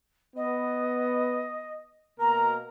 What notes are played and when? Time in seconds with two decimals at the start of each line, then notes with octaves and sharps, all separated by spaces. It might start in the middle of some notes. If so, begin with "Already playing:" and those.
0.36 B3 D#5
2.20 B2 A#3 A#4 A#5